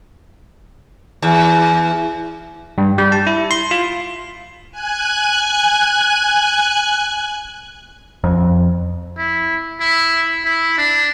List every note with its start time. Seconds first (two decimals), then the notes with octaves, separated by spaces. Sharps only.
1.22 E2
2.78 G2
2.98 G3
3.12 A5
3.27 E4
3.51 C6
3.71 F4
4.72 G#5 F#6 G#6
8.24 F2
9.18 E4
9.80 E4
10.45 E4
10.78 D4